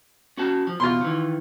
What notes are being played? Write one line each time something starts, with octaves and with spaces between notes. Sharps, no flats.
C#4 F#4 A5
F3
E2 B2 F4 C6
D#3 E3